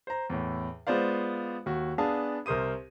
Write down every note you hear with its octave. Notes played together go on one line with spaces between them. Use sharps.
C5 A#5
E2 A2
G#3 B3 F4 C5 D5 F5
D#2 F#4
B3 D4 G#4 F5 A5
C2 A#4 C5 D#6 D#7